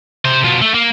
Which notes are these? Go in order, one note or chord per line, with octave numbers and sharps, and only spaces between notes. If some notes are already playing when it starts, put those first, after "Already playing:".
C3 C5
B2 F4
A3
A#3